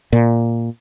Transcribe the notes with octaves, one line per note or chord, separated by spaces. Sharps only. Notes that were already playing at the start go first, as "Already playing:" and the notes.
A#2